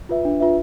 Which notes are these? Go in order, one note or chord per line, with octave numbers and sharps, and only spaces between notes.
F4 B4 E5
D4
F4 B4 E5